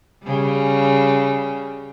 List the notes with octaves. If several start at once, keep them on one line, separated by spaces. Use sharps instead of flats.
C#3 G3